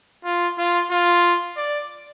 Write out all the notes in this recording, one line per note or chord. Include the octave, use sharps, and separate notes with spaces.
F4
F4
F4
D5